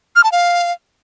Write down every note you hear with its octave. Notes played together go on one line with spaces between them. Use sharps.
F6
A5
F5